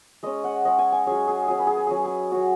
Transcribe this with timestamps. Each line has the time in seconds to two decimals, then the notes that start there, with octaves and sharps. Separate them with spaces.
0.23 G#3 C#4 D#5
0.44 F#5
0.65 G#3 C#4 D#5
0.79 G#5
0.92 G#5
1.06 F#3 C#4 G#4
1.28 G#4
1.48 F#3 C#4 G#4
1.58 B4
1.67 G#4
1.77 B4
1.87 F#3 C#4 G#4
1.96 B4
2.06 G#4
2.31 F#3 C#4 F#4